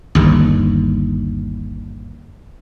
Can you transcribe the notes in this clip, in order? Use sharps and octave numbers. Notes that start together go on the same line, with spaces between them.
G1 D#2